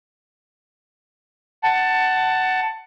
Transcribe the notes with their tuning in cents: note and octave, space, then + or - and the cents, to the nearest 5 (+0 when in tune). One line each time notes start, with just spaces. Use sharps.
F#5 +15 A5 +10